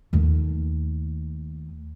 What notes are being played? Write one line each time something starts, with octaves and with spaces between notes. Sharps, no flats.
D#2 A3